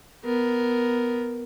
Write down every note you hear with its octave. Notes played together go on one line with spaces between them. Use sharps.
B3 A#4